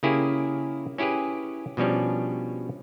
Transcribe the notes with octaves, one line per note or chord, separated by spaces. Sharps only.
C#3 A#3 C#4 E4 G4 G#4
C#4 E4 G4 G#4 B4
B2 F3 G3 C#4 D4